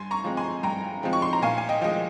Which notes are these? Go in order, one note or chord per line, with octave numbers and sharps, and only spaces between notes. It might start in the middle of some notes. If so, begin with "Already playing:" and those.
Already playing: G2 G#5 C6
A#5 C#6
F3 G#3 C4
G#5 C6
G2 G5 A#5
F3 G#3 C4
C#6
C6
A#5
A#2 F5 G#5
G#5
D#5 G5
F3 G#3 D#5